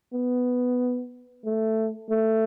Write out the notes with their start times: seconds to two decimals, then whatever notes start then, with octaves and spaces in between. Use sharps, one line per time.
0.14 B3
1.45 A3
2.10 A3